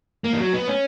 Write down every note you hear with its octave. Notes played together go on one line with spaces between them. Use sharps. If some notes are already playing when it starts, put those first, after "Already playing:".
A#3
E3
F#3
B3
C#4